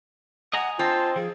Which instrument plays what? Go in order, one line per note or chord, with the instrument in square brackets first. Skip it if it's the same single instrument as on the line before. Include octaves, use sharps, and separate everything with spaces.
[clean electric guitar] D#5 G#5 A#5 [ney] F#5
[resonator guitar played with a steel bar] C4 [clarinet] F4 [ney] A5
[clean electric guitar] F3 [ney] G#4